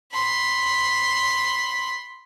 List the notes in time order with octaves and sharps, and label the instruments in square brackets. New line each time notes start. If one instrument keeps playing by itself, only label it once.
[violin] B5 C6